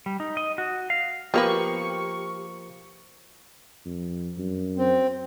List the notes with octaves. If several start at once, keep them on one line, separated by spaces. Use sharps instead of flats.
G3
D#4
D#5
F#4
F5
F3 A#3 B3 G4 A#4 B4 C#6
F2
F#2
C4